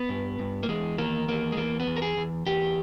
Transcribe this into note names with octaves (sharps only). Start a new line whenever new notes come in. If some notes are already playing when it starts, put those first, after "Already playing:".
Already playing: B3
G2
G2
A#3
E2 G#3
D#3 A#3
E2 A#3
G#3
E2 A#3
B3
E2
A#4
G#4
E2
E2 G4